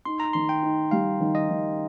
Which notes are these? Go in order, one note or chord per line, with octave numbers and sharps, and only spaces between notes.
D#4 C6
A#5
D#3 C6
G5
D#4
G3 F5
D#3
D#5
D#3